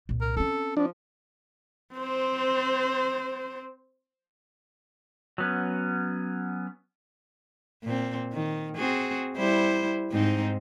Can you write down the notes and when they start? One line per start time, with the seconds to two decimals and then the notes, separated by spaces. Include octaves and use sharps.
0.09 C2 A#2
0.21 A#4
0.37 C4 C#4 A4
0.77 F3 D4
1.94 C4 C5
5.38 F#3 B3 C#4
7.83 A#2 C4
8.33 D#3
8.76 C4 F#4 G#4
9.37 G3 E4 C5
10.11 G#2 C4 D#4